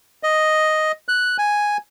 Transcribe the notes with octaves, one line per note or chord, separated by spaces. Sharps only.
D#5
F#6
G#5